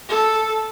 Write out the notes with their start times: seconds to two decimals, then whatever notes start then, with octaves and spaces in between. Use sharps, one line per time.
0.09 A4